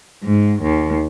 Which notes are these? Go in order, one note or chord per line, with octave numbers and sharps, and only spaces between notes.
G#2
D#2